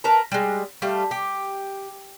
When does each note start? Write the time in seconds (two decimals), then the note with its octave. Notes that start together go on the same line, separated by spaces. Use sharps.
0.04 A#4 B4 A5 A#5
0.32 G3 G#3
0.82 G3 A3 F5
1.11 G4